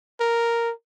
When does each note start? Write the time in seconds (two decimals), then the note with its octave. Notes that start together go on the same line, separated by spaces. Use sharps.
0.20 A#4